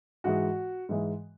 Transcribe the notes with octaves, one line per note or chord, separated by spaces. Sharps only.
G#2 E3 G#3 F#4
G#2 E3 G#3